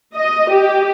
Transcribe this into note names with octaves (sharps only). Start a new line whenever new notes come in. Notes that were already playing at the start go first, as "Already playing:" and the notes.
D#5
G4